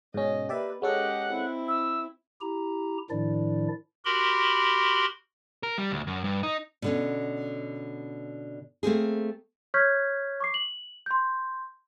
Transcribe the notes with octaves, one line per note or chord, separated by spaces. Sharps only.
G#2 B2 C#4 D#5
A#3 G4 B4 D5 E5
G#3 C#4 G4 A4 D#5 F#5
C4 E4
E5 E6
E4 G4 A#5
A2 D#3 F3 D4 E4 D5
F#4 G4 A#4 B5 C6
A#4
G3
D2
F#2
G2
D#4
B2 D3 C#4
A3 A#3 C4 G#4
C#5 C#6 F6 G6 G#6 B6
C#6 D6 C7
F#7
C6 G6